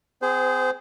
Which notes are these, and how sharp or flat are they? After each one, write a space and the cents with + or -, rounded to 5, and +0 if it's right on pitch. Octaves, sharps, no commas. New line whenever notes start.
C4 -40 G#4 +0 C5 -25